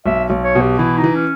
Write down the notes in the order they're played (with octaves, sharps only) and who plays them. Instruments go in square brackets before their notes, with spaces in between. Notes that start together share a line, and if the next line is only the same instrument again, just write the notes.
[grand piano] B1 [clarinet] E5
[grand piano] B1
[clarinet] C#5
[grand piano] B2
[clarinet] G4
[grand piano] E3 [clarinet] E4
[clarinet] D#4
[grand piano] E3
[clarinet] C#4